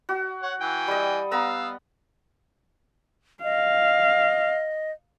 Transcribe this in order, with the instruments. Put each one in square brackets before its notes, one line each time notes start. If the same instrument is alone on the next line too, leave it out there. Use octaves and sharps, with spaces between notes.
[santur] F#4
[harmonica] C#5 F#5
E3 G5 G#5
[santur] G3 D#5
[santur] B3 A#5 [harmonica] F5 E6
[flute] D#5 [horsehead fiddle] F5